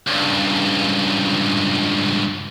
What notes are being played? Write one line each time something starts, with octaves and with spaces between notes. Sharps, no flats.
C#2 G2